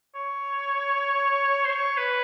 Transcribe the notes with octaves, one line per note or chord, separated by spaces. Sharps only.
C#5
C5
C#5
B4